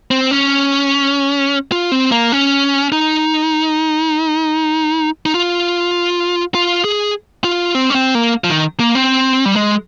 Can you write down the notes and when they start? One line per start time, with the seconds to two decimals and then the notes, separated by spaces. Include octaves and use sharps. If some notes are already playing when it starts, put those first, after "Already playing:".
0.11 C4
0.31 C#4
1.72 F4
1.92 C4
2.12 A#3
2.32 C#4
2.92 D#4
5.26 D#4
5.34 F4
6.55 F4
6.85 G#4
7.44 F4
7.75 C4
7.90 C#4
7.95 C4
8.15 A#3
8.44 F3
8.50 D#3
8.80 A#3
8.95 C4
9.46 G3
9.56 G#3